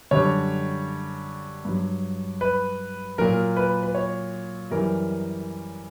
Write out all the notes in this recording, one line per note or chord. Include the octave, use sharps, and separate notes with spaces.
F#2 D3 G3 C#5
G2 F#3
B4
A#2 F#3 A#4
B4
B4
C#5
F#2 E3 G3 A#4